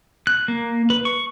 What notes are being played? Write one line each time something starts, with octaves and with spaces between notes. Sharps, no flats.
F#6
A#3
B4
C#6